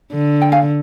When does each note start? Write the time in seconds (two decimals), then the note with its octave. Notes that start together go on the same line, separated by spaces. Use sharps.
0.12 D3
0.42 G5
0.52 F5 G#5